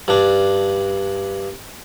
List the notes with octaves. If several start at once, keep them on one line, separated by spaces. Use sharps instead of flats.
G2 D4